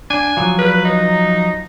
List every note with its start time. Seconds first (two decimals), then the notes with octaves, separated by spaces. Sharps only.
0.10 D4 G#5
0.37 F3 F#3
0.58 B4
0.85 D#4